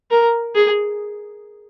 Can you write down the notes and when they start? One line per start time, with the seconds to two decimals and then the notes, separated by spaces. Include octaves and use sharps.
0.11 A#4
0.55 G#4